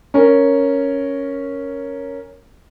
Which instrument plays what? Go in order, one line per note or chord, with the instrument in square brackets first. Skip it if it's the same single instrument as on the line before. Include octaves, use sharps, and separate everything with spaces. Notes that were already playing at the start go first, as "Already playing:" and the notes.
[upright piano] C#4 A#4